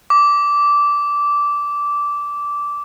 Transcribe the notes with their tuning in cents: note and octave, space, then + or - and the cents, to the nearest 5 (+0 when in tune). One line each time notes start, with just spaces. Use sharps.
D6 -15